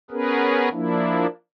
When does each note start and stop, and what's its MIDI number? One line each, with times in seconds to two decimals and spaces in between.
0.11 0.69 59
0.11 0.69 61
0.11 0.69 68
0.11 0.69 70
0.11 0.69 71
0.72 1.26 53
0.72 1.26 58
0.72 1.26 62
0.72 1.26 64